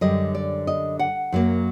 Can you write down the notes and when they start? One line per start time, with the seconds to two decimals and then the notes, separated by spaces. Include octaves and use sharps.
0.01 F#2 D3 G3 D#5
0.35 D5
0.67 D#5
0.99 F#5
1.32 F#2 F#3 A#3